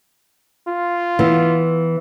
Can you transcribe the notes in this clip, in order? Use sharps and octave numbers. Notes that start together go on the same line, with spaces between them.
F4
E3 B3